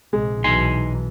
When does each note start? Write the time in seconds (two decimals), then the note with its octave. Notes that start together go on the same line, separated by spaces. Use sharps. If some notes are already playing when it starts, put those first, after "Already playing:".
0.13 A#1 C3 G#3
0.44 B1 E3 D#4 G#5 C6